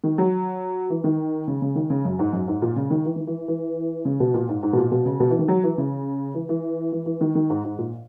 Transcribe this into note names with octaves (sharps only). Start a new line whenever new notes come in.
D#3
F#3
E3
D#3
C#3
C#3
D#3
C#3
F#2
G#2
F#2
G#2
A#2
C#3
D#3
E3
D#3
E3
E3
C#3
B2
A#2
G#2
G#2
B2
A#2
B2
C#3
B2
E3
D#3
F#3
E3
C#3
E3
E3
E3
E3
D#3
D#3
G#2
G#2
A#2